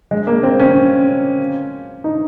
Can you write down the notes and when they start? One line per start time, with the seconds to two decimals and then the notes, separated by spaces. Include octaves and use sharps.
0.11 G#3
0.27 A#3
0.43 C4
0.59 C#4
2.04 D#4